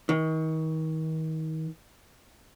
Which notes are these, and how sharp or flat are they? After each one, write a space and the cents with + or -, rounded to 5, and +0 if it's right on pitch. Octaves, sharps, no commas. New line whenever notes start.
D#3 +35